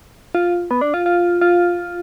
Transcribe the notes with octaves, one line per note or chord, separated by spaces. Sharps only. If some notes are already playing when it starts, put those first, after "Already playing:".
F4
B3
D4
F4
F4
F4